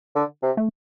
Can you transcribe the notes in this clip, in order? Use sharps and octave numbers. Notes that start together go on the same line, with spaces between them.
D3
C3
A3